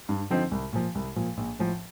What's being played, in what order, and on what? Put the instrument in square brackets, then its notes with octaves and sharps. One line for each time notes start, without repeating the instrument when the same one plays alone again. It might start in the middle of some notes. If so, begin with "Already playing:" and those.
[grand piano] G2
D3 F3 C4 D#4
C2
A#2 F3
C2
A#2 F3
A#1
A2 F3